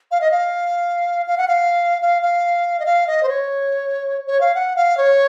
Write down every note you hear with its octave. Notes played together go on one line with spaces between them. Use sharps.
F5
D#5
F5
F5
F#5
F5
F5
F5
D#5
F5
D#5
C5
C#5
C#5
F5
F#5
F5
C#5